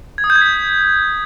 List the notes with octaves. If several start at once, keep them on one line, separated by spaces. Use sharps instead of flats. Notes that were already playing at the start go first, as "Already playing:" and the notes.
G#6
D#6
G6
G#6
B6